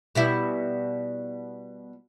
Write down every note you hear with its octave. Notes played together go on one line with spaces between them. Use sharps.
B2 G3 E4